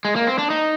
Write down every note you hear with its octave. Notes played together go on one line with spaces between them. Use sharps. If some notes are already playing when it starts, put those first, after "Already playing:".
G#3
A#3
C4
D4
D#4